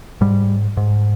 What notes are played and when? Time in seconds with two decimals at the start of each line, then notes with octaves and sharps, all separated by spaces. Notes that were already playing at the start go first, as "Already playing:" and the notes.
0.21 G#2 G3
0.77 G#2